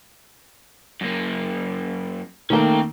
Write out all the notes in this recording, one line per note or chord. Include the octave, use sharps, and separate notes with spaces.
F#2 A#3
D#3 A3 A#3 C#4 G5